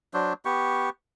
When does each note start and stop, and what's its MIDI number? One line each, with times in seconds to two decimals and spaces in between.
0.14 0.33 54
0.14 0.33 62
0.14 0.33 72
0.45 0.90 59
0.45 0.90 67
0.45 0.90 85